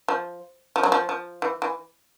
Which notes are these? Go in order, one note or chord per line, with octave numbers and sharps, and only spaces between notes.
F3
F3
F#3
F3
F3
E3
E3